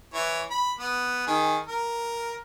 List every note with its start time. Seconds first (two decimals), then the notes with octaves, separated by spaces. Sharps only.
0.14 E3 C#5
0.50 B5
0.79 B3
1.27 D#3 G#4
1.66 A#4